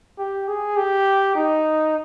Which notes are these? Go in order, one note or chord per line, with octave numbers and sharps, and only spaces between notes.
G4
G#4
G4
D#4